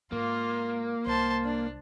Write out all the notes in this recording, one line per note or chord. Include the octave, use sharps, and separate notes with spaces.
G#2 A#3 F4
C2 G#2 C5 A5
D4